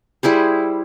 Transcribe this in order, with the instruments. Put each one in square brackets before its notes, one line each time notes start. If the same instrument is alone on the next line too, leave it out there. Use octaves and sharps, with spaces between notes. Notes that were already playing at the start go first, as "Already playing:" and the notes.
[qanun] G3 E4 G#4 C5